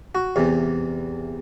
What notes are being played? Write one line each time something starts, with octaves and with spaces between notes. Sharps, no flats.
F#4
E2 C3 E3